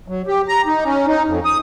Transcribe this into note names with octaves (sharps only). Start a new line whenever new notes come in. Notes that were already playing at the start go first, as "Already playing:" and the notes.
F#3
G4
A#5
D#4
C#4
D#4
F2
D#6